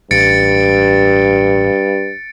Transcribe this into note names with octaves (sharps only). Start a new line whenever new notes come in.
A1 G2 A6 C#7 D7